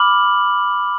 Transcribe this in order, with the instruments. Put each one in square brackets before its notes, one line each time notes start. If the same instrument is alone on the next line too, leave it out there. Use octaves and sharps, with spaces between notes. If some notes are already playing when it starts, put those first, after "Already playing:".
Already playing: [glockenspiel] B5 D6 F6 F#7